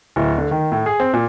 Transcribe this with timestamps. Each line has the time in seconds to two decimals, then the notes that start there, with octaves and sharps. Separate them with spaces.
0.16 D1
0.38 D3
0.51 D#3
0.72 A2
0.86 G#4
1.00 C4
1.14 A#2